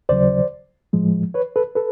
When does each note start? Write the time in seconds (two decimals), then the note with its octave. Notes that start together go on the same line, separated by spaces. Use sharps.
0.09 D#2 C#3 F#3 C5 D5
0.93 A2 F3 G#3
1.34 B4 C#5
1.56 A4 B4
1.75 A4 B4